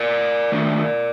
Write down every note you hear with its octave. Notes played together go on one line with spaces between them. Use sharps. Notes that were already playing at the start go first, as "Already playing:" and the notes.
Already playing: A#4 D5
D#3 A3 D4